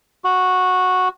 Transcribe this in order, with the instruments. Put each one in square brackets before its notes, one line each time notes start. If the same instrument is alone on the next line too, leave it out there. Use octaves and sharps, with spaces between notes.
[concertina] F#4